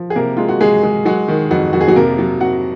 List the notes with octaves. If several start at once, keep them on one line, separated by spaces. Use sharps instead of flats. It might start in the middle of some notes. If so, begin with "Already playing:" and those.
Already playing: F3
G#4
C3 A#3 A#4
G#3 F4
F#4
G#3 G#4
G#3
F#3 G#3 F#4
D#3
F2 F#3 F#4
F2 F#4
G#4
F#3 F#4
C3 A#3 A#4
F#3
C3 F#4 F#5